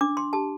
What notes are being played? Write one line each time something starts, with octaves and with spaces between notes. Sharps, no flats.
D4 D6
C6
G4 A5